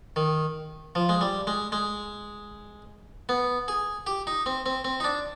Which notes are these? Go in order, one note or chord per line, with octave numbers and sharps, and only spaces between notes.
D#3
F3
G#3
G3
G#3
G#3
B3
G#4
G4
D#4
C4
C4
C4
D#4
D4